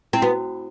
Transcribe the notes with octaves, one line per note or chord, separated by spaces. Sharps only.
C4 E4
B3 F#4